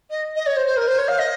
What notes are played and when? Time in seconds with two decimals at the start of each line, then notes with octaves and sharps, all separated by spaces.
0.10 D#5
0.35 D#5
0.46 C#5
0.56 C5
0.66 C5
0.76 A#4
0.87 C5
0.98 C#5
1.08 F5
1.18 D#5